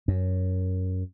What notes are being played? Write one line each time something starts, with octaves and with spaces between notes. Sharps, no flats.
F#2